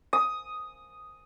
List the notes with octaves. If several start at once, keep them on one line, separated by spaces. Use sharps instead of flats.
D#6